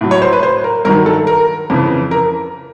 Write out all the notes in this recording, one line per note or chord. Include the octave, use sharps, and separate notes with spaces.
A2 F#3
C#5
C5
B4
C5
A#4
G2 D#3 F#3 A#4
A4
A#4
F2 C#3 E3
A#4